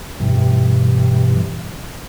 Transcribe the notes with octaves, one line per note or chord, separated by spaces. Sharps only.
G2 B2 E3 G3